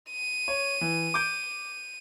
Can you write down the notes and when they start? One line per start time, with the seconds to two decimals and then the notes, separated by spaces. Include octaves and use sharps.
0.11 D#7
0.48 C#5
0.81 E3
1.14 D6 G6 D7